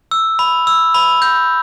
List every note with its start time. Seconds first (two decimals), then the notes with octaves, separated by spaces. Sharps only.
0.11 E6
0.39 B5
0.67 E6
0.94 B5
1.22 G6